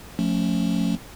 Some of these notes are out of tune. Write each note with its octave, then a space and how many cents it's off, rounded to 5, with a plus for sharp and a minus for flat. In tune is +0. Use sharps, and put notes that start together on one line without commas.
F3 +30 A3 +10 C#4 +0